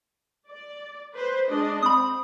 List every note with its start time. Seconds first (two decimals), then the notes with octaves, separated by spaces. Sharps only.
0.48 D5
1.14 B4 C5
1.49 G#3 D4 D#5
1.83 C4 B5 D#6